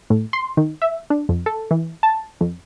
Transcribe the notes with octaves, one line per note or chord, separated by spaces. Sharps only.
A2
C6
D#3
E5
D4
F2
A4
E3
A5
F2